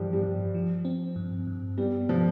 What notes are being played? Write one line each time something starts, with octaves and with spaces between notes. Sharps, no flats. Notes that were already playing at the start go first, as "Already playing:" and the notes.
Already playing: G2 E3 F3 G3
G3
G2
F3
C4
G2
G2
G3 B3
B2 F3